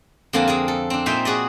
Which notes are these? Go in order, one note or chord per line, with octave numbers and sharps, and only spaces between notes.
F2 D3 A#3 C4 G#5 A5
A#3 G#4 G#5
A4
C4 D4
A#2 D#4 C5 E5 G5 G#5
F#4 G#4 D5 D#5